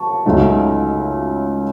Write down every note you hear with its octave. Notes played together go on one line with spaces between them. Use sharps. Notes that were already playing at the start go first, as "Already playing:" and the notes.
Already playing: A5 C#6
C#2 C#3 F#3 A3 D#4